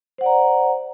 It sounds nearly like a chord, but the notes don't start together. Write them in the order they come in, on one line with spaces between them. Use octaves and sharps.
C5 F#5 D5 A#5